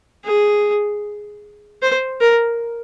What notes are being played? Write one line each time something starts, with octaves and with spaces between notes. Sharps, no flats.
G#4
C5
A#4